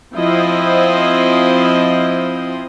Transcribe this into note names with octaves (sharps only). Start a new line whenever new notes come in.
F3 C4 E4 C5 D#5